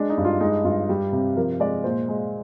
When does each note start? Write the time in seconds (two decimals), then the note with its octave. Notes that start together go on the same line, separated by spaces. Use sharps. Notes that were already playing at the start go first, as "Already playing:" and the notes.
Already playing: G#3 D4
0.09 D#4
0.17 G2
0.25 F4
0.41 G#3 D#4
0.64 G2 F4
0.89 G3
1.13 C3
1.36 F3 A#4
1.60 G#3 D5
1.84 A#2 C5
2.09 G#3